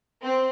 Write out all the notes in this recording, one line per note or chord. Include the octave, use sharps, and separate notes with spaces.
C4